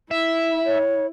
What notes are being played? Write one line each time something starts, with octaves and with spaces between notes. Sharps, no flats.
E4 E5
C#5